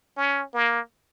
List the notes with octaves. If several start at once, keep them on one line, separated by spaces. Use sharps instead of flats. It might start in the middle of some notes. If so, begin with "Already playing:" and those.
C#4
A#3